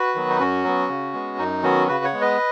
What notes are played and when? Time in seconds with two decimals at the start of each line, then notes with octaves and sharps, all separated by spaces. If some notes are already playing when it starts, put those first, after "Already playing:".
Already playing: F#4 B4
0.15 D#3 F#3 B3
0.30 D#4
0.40 F#2 C#4 F#4
0.64 F#3 B3
0.89 C#3
1.13 G#3 B3
1.38 F#2 D#4
1.63 D#3 F#3 B3 C#4 F#4
1.88 C#3 F#4 B4
2.05 C#5 F#5
2.13 G#3 B3
2.21 B4 D#5